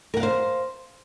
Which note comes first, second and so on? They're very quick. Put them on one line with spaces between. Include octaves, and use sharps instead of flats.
A#4 F#5 F5 C5